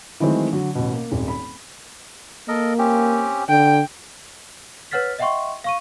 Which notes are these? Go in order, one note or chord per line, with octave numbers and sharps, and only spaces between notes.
D#3 E3 F#3 G#3 A3 C4
D3 F#3
A1 B2
A#3
D#1 G#1
B5
A#3 A4 A#4 D#5
C4 C#4 G4
D3 G5
B4 C#5 F#5 F6 A6 B6
D#5 E5 F#5 G5 C6 C#6
F5 C#6 D#7